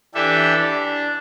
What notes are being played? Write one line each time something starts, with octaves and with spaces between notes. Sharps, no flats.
E3 D4 G4 A4 E5
D4